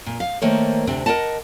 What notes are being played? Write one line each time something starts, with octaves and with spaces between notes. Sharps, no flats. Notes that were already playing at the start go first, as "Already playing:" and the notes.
A#2
F5
D#3 A3 A#3 C5 C#5
D2 C3 C4 D4
A#4 C#5 D#5 F#5 A5